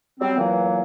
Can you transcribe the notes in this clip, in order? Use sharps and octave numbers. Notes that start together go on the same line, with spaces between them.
F#3 G3 C4
E2 A#2 E3 F#3 A#3